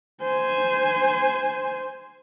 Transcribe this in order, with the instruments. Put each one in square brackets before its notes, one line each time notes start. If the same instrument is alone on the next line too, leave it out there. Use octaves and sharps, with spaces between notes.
[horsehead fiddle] C5 G#5